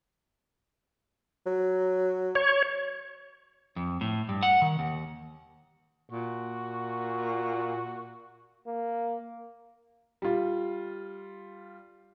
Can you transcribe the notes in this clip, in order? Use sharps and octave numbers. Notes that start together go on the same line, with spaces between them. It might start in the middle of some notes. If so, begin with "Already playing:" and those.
F#3
C#5
F2
A2
G2
F#5
D#3
D#2
A#2 F#4
A#3
G3 F4